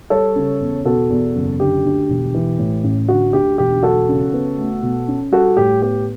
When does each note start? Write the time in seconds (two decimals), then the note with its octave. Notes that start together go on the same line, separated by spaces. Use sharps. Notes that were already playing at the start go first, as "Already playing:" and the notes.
0.10 G3 A4 C#5
0.36 C#3
0.61 E2
0.85 B2 F#4 A4
1.10 E2
1.35 F#1
1.60 D3 G4
1.85 D2
2.09 E1
2.34 E3
2.59 A2
2.84 A1
3.08 D3 F#4
3.33 D2 G4
3.58 E1 G4
3.83 F#3 F#4 A4
4.09 C#3
4.33 B3
4.58 A3
4.82 B2
5.08 C#4
5.32 G3 F#4 A4
5.57 A2 G4
5.82 B3 G4